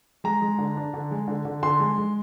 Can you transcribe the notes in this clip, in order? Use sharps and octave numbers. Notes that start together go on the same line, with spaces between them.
G#3 A#5
G#3
D3
D4
D3
G#3
D3
D3
D3 C6
G#3
G#3